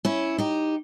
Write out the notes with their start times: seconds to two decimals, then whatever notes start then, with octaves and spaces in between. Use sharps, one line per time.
0.05 C#4 E4
0.38 D#4 G4